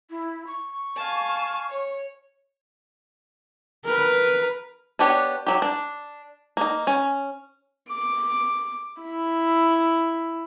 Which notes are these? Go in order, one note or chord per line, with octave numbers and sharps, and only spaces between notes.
E4
C#6
F5 G#5 A5
C#5
A#4 B4
B3 D4 G4 C#5
F#3 G4
D4
A#3 D#4
C#4
D6
E4